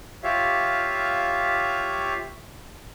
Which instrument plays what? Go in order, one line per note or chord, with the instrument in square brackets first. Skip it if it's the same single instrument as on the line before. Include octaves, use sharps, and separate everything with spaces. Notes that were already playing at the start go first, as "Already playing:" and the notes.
[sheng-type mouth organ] F4 G4 C#5 E5 F5